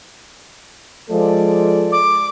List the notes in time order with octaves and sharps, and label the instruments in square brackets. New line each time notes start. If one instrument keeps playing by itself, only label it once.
[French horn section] F3 G#3 [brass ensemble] A4 D5
[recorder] D6